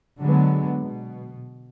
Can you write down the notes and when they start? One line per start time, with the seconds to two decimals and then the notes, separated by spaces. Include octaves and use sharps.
0.19 D3 F#3 G#3 B3
0.79 B2